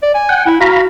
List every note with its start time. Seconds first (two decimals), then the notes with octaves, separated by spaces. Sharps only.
0.03 D5
0.15 G#5
0.29 F#5 G5
0.46 E4
0.60 F#4 F5 A#5 B5